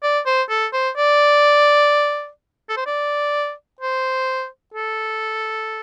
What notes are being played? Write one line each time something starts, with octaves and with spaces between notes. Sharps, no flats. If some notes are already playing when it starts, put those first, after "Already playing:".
D5
C5
A4
C5
D5
A4
C5
D5
C5
A4